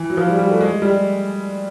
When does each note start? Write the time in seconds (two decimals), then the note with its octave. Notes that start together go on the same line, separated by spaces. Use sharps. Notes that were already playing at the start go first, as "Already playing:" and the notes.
Already playing: E3
0.10 F#3
0.17 F3
0.28 G3
0.39 G3
0.51 A3
0.61 G#3
0.82 G3